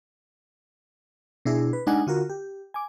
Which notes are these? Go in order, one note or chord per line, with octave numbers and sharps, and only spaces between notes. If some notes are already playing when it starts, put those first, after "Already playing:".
B2 D4 E4 G#4
B4
G#3 D4 D#4 F#5 G#5
D3 F4 F#4 A#4
G4
G#5 D6